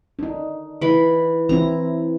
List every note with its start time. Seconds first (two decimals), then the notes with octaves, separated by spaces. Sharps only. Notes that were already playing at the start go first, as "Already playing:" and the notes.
0.19 D4 D#4
0.81 E3 B5
1.49 E3 C4 E4 A#5